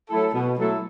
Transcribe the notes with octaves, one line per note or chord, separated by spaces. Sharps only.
F#3 A3 E4 A4
B2
F#3 A3 E4 A4